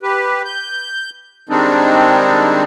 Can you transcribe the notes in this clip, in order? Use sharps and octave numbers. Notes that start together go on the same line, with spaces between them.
G4 B4
G6
D#3 G3 G#3 C4 D4 D#4